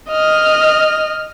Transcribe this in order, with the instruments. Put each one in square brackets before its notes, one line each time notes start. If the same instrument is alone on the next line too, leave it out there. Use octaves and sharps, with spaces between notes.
[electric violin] D#5 F6